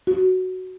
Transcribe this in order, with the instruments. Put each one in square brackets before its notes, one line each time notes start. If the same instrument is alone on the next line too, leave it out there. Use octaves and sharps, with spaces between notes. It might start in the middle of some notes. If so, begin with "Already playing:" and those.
[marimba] F#4